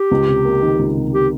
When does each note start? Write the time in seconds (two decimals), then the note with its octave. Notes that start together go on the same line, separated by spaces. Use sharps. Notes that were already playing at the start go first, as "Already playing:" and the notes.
Already playing: G4
0.11 C#2
0.28 C3
0.45 A#3
0.62 D#3
0.79 C#2
0.97 C3
1.13 G4